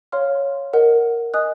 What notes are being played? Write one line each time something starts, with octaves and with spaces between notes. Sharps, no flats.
C#5 F5 C6 F6
A#4 D#5 F#5
D#5 G#5 D#6 F#6